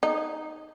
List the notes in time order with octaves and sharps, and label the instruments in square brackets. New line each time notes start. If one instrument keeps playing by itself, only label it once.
[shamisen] D#4